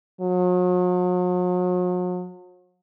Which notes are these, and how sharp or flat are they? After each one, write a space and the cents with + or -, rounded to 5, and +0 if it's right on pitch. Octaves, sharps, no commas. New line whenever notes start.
F#3 -45